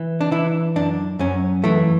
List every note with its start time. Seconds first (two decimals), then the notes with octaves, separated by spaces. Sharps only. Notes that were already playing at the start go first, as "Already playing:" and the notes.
Already playing: E3
0.21 D4
0.31 E3 E4
0.76 F#2 D4
1.19 F#2 C#4
1.64 E3 A3